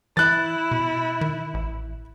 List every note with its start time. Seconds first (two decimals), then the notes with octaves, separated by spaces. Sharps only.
0.17 E3 E4 F#6 A6
0.71 B2
1.21 D#3
1.54 A1